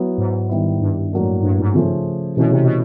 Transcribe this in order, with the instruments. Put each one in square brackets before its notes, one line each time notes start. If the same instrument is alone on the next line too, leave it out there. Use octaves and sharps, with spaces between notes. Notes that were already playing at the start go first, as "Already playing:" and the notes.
Already playing: [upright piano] F#3 B3 E4
[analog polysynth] G#2
[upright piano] D#3 G3 B3 E4
[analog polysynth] G2
[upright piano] A2 F#3 A#3 D4
[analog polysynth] G2
G#2
[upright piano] C#3 F3 A3 C#4
[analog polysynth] B2 [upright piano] E3 A3 C#4 E4
[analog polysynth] C3
B2